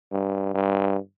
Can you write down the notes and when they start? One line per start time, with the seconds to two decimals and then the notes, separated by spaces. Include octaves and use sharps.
0.12 G2
0.54 G2